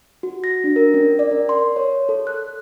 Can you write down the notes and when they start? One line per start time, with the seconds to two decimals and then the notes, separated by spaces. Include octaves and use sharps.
0.23 F#4
0.44 A#6
0.64 D4
0.76 A#4
0.94 C#4
1.19 D5
1.31 A#4
1.49 C6
1.76 C#5
2.09 A4
2.27 F#6